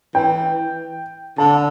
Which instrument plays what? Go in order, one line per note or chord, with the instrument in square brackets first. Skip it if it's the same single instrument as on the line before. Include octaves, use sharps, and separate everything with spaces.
[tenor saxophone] E3 [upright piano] G5
[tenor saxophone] D3 [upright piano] A5